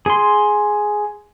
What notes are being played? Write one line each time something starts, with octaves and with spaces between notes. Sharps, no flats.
G#4 C6